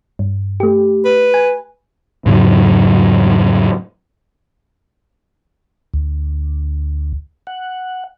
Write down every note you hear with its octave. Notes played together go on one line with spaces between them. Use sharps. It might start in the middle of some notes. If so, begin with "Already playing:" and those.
G2
A3 G4
B4
G#5
E2 G#2 C#3 F#3
D2
F#5